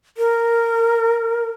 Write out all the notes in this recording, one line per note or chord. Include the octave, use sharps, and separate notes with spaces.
A#4